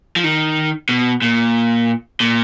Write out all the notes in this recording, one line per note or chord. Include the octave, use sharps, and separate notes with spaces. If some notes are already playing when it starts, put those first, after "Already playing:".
F3
D#3
B2
A#2
A#2